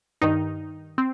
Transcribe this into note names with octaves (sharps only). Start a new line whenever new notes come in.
G2 D#3 D#4
C4